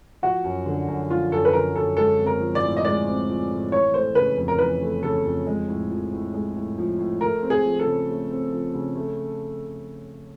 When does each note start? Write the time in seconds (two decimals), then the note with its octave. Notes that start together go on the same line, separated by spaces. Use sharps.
0.22 F3 F#4
0.44 F#2
0.66 D3
0.88 F#2
1.10 F3 F4
1.31 F#2 A4
1.45 B4
1.53 D3 A#4
1.76 F#2 A4
1.97 G#3 A4
2.19 C4
2.27 A#4
2.40 F3
2.55 D5
2.63 A2
2.77 D#5
2.84 G#3 D5
3.06 C4
3.28 F3
3.50 A2
3.72 E3 C#5
3.93 A3 C5
4.15 C#3 B4
4.37 F2
4.48 A#4
4.59 E3 B4
4.81 A3
5.03 C#3 A4
5.25 F2
5.47 G#3
5.68 A2
5.91 F3
6.12 A2
6.34 G#3
6.56 A2
6.78 F3
6.99 A2
7.21 A3 A#4
7.42 C4
7.50 G#4
7.65 F3
7.79 A4
7.86 C#3
8.09 A3
8.31 C4
8.52 F3
8.74 C#3
8.95 A3